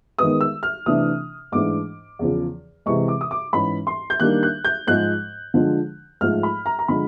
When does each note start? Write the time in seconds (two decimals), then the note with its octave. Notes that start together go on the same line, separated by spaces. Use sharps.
0.19 D#3 G#3 B3 D#6
0.41 E6
0.63 F6
0.86 C3 E3 A3 D4 D#6
1.52 G#2 E3 A3 D4 D6
2.19 E2 C#3 F3
2.86 C3 E3 G#3 C#6
3.08 D6
3.21 D#6
3.31 D6
3.53 G#2 E3 G#3 C#4 B5
3.87 C6
4.10 G6
4.20 D#3 G3 A#3 D4 F#6
4.43 F#6
4.65 G6
4.87 G#2 F3 G#3 F#6
5.54 D3 F3 G#3
6.21 G#2 F3 A3 F6
6.43 B5
6.66 A#5
6.79 A#5
6.88 D3 F3 G#3 B5